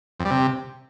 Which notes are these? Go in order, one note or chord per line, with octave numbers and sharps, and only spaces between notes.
F2
G3
C3